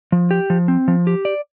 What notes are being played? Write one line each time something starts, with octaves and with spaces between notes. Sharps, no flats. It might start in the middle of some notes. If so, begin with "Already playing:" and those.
F3
G4
F3
C4
F3
G4
D5